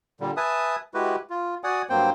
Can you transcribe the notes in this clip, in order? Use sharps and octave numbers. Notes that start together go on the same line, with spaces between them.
A#2 D3 G3
B4 E5 G#5 A5 D#6
G#3 E4 F#4 G4 B4
F4
F#4 D5 F#5 G#5 D#6
G2 F#3 A#3 C4 C5 G5